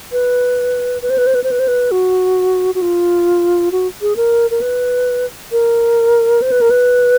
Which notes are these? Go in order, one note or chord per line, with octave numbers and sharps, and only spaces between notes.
B4
B4
C5
B4
C5
B4
C5
B4
C5
B4
F#4
F#4
F4
F#4
G#4
A#4
A#4
B4
A#4
C5
B4
A#4
B4